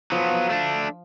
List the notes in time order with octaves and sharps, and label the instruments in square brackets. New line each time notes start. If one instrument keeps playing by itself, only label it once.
[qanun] F3 [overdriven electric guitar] F#3 B3
[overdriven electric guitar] A3 D4